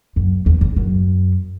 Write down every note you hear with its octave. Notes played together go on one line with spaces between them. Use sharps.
F#2
E2
E2
F#2